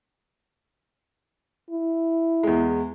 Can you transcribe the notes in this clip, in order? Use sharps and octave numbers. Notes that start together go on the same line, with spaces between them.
E4
E2 G#3